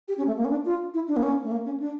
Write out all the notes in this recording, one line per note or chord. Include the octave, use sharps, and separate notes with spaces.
G4
C#4
A3
A#3
C#4
D4
F4
E4
D4
A#3
C#4
A3
A#3
C#4
D4